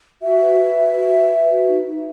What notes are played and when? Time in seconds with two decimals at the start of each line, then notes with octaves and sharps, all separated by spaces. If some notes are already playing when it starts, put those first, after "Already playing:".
0.22 F#4 E5
0.40 B4
0.58 B4
0.76 F#4
0.95 F#4
1.12 B4
1.31 B4
1.49 F#4
1.67 D#4
1.85 D#4